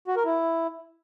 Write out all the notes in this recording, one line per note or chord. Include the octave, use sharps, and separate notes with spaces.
F#4
A#4
E4